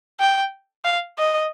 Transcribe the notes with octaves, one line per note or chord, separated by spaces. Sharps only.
G5
F5
D#5